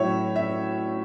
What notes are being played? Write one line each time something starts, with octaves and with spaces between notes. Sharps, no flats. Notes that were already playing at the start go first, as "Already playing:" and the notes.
Already playing: A2 F#3 C#4 E4 C#5 E5
E5